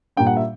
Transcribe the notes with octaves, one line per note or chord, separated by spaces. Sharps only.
A#2 G3 A#3 D4 G5
F#5
E5